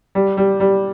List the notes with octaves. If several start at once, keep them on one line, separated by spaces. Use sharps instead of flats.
G3
G3
G3